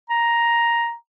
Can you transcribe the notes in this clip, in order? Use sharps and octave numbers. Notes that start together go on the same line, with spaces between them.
A#5